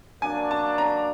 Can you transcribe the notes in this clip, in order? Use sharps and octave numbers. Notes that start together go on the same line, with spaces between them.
F#3 A#3 D4 G#5
A5
A#5